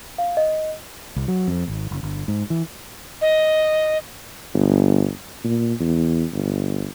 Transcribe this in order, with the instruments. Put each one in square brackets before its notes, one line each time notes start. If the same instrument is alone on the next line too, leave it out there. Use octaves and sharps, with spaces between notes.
[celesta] F5
D#5
[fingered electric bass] C2
F#3
F2
G#1
F#1
G1
G#2
E3
[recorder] D#5
[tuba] G1
A#2
E2
G1